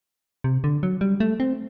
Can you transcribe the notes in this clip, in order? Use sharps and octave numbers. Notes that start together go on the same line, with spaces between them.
C3
D3
F#3
G3
A3
C4